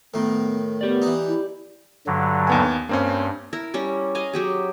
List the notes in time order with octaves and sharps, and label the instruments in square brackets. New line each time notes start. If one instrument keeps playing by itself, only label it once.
[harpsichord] A2 D#3 [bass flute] B3
[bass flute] B3 [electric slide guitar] G4 D5
[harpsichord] E3 D#4
[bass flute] E4
[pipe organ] G2 D3 F#3
[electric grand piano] D#2 B3 G#5
[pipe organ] G2 [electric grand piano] A#3 C4 C#4
[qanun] E4 A#4
G3 C#4
D#5 F5 G#5 A#5
F#3 G4 G#4